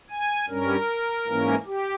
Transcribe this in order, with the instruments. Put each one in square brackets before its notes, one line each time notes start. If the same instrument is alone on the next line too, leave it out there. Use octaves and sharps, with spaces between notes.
[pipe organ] G#5
G2 G3 C#4 A#4
G#2 E3 A#3 C#4
G4